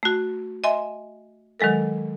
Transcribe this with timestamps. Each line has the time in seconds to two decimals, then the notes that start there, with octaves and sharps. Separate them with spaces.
0.03 A3 F#4
0.64 D#5 E5 G#5 C6
1.60 D#3 F#3 G#3 A4 A#4